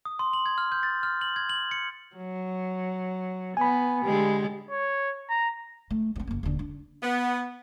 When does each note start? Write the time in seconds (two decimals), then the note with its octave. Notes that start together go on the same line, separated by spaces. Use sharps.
0.05 D#6
0.19 C6
0.33 F#7
0.46 G#6
0.58 F6
0.72 G6
0.83 A6
1.03 F6
1.21 F#7
1.36 G#6
1.49 F#7
1.71 C#7
2.16 F#3
3.57 B3 G#5 B5
4.03 D3 G#3 G4
4.71 C#5
5.30 A#5
5.91 A3
6.16 G2 C4
6.27 F#1 A#3
6.43 D#1 D3
6.59 D4
7.03 B3